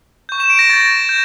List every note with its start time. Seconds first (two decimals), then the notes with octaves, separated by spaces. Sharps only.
0.29 C#6 G6
0.40 E7
0.50 D7
0.59 A#6
0.69 C#6 G6 A6
1.09 G6